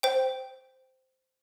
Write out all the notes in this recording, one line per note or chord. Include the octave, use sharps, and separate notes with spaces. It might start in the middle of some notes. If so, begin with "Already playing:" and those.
C5 G5